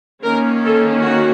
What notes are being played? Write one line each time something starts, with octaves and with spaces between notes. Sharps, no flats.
D#3 A#3 C#4 A#4
A4
F#4